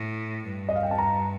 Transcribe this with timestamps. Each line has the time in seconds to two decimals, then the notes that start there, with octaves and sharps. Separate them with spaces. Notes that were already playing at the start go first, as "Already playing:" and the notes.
Already playing: A2
0.44 G2
0.69 D#5
0.76 F5
0.83 G5
0.91 A5
0.98 A#5